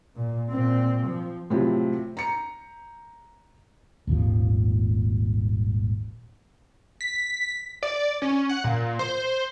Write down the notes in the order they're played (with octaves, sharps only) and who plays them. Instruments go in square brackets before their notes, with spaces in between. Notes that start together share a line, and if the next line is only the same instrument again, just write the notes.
[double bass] A#2
A#2 C4
F3
[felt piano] A2 C3 F3 F#3
A#5 C#7
[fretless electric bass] D#1 G#1 D#2 F3
[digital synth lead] B6
D5
C#4
F#5
A#2
C5